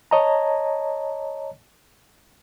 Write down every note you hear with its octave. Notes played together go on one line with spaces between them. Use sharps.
C#5 D#5 A5 A#5